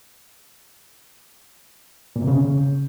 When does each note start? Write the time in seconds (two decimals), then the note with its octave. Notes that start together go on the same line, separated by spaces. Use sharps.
2.16 A#2
2.21 C3
2.27 C#3